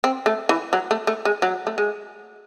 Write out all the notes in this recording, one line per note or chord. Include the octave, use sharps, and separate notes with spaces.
C4
A3
E3
F#3
A3
A3
G#3
F#3
A3
G#3